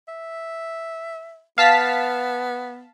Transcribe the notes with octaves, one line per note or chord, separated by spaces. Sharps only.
E5
B3 F5 A5 B6